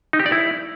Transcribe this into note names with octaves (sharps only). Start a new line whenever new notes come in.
D#4
G4
D5
E4